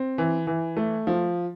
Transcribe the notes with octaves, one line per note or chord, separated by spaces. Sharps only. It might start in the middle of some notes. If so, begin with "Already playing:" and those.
Already playing: C4
E3
E3
A3
F3